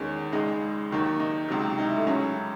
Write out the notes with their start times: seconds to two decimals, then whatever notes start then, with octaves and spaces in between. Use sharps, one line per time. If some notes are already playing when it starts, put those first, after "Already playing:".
Already playing: E2 D#3 G#3 C#4
0.32 C#2 C#3 G#3 D#4
0.91 D#2 D#3 F#3
1.20 D#4
1.48 C#2 C3 F#3
1.78 D#4
1.87 E4
1.97 A3
2.07 C#2 C#3 F#3 C#4